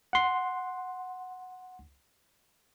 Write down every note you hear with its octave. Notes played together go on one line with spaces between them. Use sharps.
F#5 C6